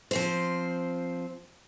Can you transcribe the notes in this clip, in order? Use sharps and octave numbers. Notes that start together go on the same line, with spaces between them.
F3 C4 C5